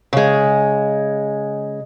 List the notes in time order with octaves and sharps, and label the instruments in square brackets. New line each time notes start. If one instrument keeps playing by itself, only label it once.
[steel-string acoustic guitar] C#3 G#3